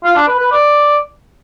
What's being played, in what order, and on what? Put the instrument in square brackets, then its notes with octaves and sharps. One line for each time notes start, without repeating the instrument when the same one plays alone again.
[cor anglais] F4
D4
B4
B4
D5